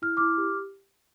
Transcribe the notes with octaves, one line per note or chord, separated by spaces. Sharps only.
E4 F6
E4 D6 F6
G4